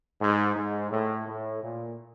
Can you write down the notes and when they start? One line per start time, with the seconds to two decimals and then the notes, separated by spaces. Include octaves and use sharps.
0.21 G#2
0.56 G#2
0.91 A2
1.27 A2
1.63 A#2